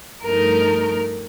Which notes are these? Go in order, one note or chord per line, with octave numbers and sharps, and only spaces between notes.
G2 F3 A3 D#4 A#4